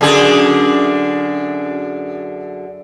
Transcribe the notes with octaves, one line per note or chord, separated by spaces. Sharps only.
F#2 D3 G#4